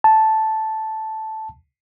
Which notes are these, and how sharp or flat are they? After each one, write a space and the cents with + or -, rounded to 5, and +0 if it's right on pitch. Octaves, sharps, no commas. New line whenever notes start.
A5 -5